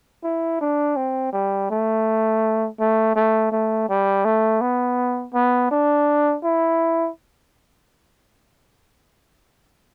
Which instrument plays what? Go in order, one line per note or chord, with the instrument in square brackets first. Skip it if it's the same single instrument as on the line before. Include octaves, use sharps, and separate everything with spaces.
[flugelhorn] E4
D4
C4
G3
A3
A3
A3
A3
G3
A3
B3
B3
D4
E4